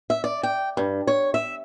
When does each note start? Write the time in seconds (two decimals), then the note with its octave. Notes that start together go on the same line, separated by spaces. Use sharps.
0.10 E5
0.24 D5
0.43 G5
0.77 G2
1.07 C#5
1.34 E5